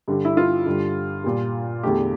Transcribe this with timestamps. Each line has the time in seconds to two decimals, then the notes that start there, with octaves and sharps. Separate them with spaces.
0.08 G2 D3 G3
0.25 E4
0.37 F4
0.66 G2 D3 G3
1.24 A#2 G3
1.83 E2 D3 A3 G4